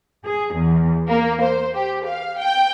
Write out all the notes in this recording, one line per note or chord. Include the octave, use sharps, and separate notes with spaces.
G#4
E2
A#3
C5
G4
F5
G5